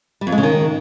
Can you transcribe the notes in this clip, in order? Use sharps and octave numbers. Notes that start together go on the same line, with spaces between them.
G3
F2
G#3
C#3
D#3